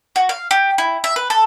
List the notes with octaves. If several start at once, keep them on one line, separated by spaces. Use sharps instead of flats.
F#4
F5
G4
E4
E5
B4
A4